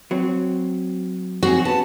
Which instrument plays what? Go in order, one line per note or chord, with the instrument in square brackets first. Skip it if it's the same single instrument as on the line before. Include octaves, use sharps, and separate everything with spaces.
[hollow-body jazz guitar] F#3 C4
[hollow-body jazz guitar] F#3 C4 G#4 [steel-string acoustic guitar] F#4
[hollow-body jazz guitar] B3 C#4 [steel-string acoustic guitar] A5